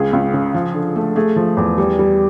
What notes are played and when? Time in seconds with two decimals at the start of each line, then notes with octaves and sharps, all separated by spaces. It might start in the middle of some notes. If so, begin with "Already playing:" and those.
Already playing: C#2 G#4
0.13 C#2
0.33 C#3
0.54 F3
0.74 D3
0.96 A3
1.16 A3 G#4
1.36 F3
1.57 E2
1.78 G3
1.99 G3